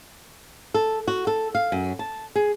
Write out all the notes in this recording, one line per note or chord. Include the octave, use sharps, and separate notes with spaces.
A4
F#4
A4
F5
F#2
A5
G#4